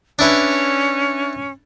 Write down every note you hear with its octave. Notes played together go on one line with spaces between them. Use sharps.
C#4 D4 E4 B4